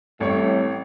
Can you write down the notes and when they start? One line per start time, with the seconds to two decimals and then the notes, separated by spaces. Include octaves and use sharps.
0.20 A1 A2 G3 A3 C4 C#5